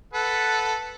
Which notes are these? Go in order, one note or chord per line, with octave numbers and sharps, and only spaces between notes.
A4 B4 F#5